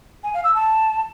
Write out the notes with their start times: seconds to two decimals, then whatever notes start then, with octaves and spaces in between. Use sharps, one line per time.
0.23 G#5
0.34 F5
0.44 E6
0.54 A5